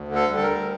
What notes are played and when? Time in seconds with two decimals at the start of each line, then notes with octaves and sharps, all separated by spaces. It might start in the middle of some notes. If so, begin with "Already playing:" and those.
Already playing: D2
0.08 D3
0.15 A4
0.28 G3
0.36 A4
0.43 A#4
0.49 D2